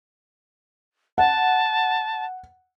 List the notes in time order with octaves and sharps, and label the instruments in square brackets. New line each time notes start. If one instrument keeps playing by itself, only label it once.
[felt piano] F#5 [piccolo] A5